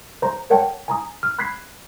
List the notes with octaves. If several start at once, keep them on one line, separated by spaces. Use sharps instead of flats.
C5 A#5
A#4 C#5 F#5 G5 A5
G#5 A#5 D#6
F6
B5 F#6 G#6 B6 C7